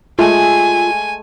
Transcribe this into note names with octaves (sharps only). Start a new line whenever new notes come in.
G#3 A3 F4 G#5